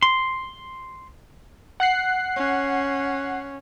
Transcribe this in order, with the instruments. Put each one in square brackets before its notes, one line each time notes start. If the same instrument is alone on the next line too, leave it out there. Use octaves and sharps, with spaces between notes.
[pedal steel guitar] C6
[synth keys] F#5 F#6 C7
[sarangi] C#4